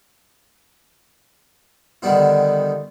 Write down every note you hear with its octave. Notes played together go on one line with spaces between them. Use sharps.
D3 D#3 G3 B3 E4